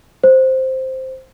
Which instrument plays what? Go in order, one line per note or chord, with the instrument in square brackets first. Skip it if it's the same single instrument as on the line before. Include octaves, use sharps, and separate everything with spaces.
[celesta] C5